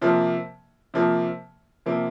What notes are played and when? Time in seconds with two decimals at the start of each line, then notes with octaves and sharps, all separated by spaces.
0.01 C3 F3 A#3
0.94 C3 F3 A#3
1.86 C3 F3 A#3